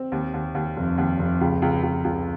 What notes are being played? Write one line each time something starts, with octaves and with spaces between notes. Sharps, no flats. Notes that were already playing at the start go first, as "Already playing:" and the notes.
Already playing: C4
D#2
D#2
D#2
F1
D#2
F1
C#2
C#2
C#2
C#2